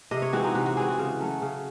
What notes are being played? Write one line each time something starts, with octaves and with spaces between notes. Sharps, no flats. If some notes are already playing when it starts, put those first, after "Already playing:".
C3 D#5
C#5
E3 G#3 C4 F#4
D#4
C3 F#4
F#4
E3 G#3 C4 G#4
F#4
C#3
F#3 A3 C#4
C#3